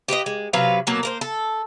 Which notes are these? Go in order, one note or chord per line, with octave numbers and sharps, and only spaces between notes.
G4 B4 C5 D#5
G#3
C3 F#3 B4 F5
B2 F#3 A#3 A4
A#3 A#4 C5
A4